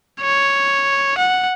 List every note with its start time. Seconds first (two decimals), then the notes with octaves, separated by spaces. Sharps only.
0.21 C#5
1.18 F#5